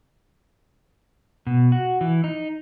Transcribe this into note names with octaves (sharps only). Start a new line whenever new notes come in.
B2
F#4
E3
D#4